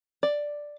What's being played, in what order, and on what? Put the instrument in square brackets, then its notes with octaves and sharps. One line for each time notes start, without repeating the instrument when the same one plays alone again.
[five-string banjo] D5